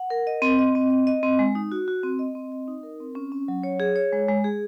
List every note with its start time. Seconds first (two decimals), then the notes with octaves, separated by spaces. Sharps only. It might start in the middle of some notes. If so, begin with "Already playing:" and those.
Already playing: F#5
0.10 A#4
0.27 D#5
0.42 C4
0.59 D#5
0.75 C4
0.90 D#5
1.07 D#5
1.23 C4
1.39 G#3
1.55 D#4
1.72 F#4
1.88 F#4
2.03 C4
2.19 D#5
2.35 C4
2.52 D#5
2.68 D#4
2.83 A#4
3.00 C4
3.15 C#4
3.32 C#4
3.48 F#3
3.63 C#5
3.80 G#4
3.96 C#5
4.12 G#3
4.28 G#3
4.44 G#4